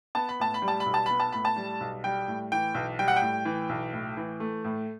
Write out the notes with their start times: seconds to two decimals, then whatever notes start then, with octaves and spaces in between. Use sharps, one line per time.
0.15 B3 A5
0.29 B5
0.40 A2 A5
0.54 B5
0.62 G3
0.68 A5
0.80 B5
0.86 B1
0.94 A5
1.06 B3 B5
1.20 A5
1.33 A2 B5
1.45 A5
1.56 G3
1.81 B1
2.04 G3 G5
2.28 A2
2.52 E3 G5
2.74 B1
2.99 G3 G5
3.08 F#5
3.16 G5
3.22 A2
3.45 E3
3.69 B1
3.93 A2
4.17 E3
4.40 A3
4.64 A2